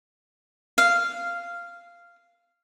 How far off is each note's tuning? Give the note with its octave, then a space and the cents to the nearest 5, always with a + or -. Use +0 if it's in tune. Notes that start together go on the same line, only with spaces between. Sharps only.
F5 -10